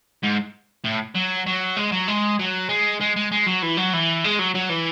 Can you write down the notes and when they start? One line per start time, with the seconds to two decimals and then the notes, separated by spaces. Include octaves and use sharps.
0.23 G#2
0.85 A2
1.15 F#3
1.47 F#3
1.77 G#3
1.92 F#3
2.08 G#3
2.39 F#3
2.69 G#3
3.01 G#3
3.16 G#3
3.32 G#3
3.47 F#3
3.63 E3
3.77 F#3
3.93 E3
4.24 G#3
4.39 F#3
4.55 F#3
4.69 E3